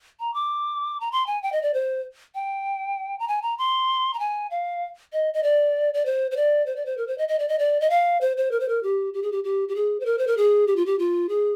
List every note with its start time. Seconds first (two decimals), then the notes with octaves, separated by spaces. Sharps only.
0.20 A#5
0.34 D6
1.00 A#5
1.12 C6
1.27 G#5
1.43 G5
1.52 D#5
1.62 D5
1.74 C5
2.35 G5
3.19 A#5
3.28 G#5
3.42 A#5
3.58 C6
4.14 A#5
4.19 G#5
4.51 F5
5.13 D#5
5.34 D#5
5.43 D5
5.94 D5
6.06 C5
6.31 C5
6.37 D5
6.66 C5
6.76 D5
6.86 C5
6.97 A#4
7.07 C5
7.18 D#5
7.28 D#5
7.39 D5
7.48 D#5
7.59 D5
7.80 D#5
7.90 F5
8.21 C5
8.37 C5
8.51 A#4
8.60 C5
8.69 A#4
8.83 G4
9.14 G4
9.22 G#4
9.32 G4
9.44 G4
9.69 G4
9.75 G#4
10.00 C5
10.06 A#4
10.18 C5
10.27 A#4
10.37 G#4
10.67 G4
10.76 F4
10.86 G4
10.99 F4
11.29 G#4